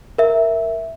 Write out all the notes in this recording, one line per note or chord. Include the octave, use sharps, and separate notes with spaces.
A#4 E5